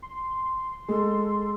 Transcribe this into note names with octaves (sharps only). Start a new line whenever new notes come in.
C6
G#3 A4